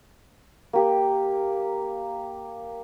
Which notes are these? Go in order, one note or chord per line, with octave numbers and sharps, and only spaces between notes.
A#3 G4